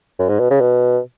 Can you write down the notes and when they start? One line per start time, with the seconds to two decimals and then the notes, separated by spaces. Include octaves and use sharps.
0.19 F#2
0.29 G#2
0.40 B2
0.50 C#3
0.61 B2